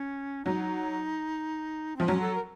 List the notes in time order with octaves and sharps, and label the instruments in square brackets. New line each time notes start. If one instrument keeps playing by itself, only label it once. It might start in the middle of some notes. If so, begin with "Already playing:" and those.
Already playing: [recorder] C#4
[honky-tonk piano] F#3 [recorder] D#4
[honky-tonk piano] F3 [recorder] C4
[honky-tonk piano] F#3 [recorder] C#4
[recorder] A4
A#4